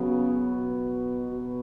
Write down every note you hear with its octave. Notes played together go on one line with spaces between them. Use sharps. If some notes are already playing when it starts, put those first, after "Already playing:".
Already playing: C#3 F#3 B3
B2
B2